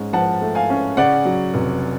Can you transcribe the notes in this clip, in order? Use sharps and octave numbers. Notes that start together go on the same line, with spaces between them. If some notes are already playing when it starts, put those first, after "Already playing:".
Already playing: G#2 C#4
F3 F#5 A5
A3
F5 G#5
C#4
C#3 D5 F#5
F#3
F1